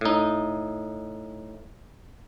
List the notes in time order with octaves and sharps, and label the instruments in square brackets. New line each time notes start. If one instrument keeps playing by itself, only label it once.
[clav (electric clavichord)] A2 D#4